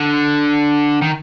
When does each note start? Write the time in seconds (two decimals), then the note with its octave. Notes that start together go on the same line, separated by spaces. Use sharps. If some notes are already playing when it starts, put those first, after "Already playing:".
Already playing: D3
1.01 D#3